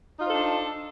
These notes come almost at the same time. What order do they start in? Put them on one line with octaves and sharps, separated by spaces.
D#4 F4 C5 A4 D4